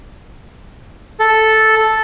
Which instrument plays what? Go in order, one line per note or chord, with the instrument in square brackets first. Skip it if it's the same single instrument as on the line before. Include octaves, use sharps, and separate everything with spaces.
[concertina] A4